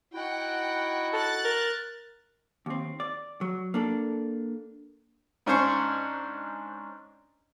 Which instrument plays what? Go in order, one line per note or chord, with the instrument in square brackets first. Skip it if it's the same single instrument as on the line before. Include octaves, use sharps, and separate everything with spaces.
[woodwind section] D#4 E4 F#4 [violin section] F#5 G5
[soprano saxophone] A4 [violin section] F#6 A6
[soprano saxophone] A#4
[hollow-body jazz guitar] D#2 C4
D5
F#3
A#3 D4 A4
[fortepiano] G#2 C#4 D4 C5 C#6